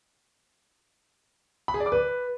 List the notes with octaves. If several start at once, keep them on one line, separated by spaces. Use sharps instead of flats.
B5
G#4
D5
D6
B4